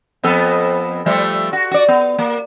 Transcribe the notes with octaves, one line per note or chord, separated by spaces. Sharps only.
F2 B3 A4
F3 G3 A3
F#4
F#4 D5
B3
A#3